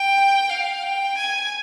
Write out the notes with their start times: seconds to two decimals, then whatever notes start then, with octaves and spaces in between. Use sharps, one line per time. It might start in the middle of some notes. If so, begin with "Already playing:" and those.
Already playing: G5
0.50 F5
0.83 G5
1.17 G#5